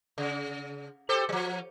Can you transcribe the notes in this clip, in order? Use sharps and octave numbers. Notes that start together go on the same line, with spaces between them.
C#3
G4 A4 C5
F3 G3